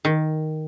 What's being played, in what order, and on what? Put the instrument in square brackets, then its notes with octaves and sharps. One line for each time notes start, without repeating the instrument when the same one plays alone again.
[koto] D#3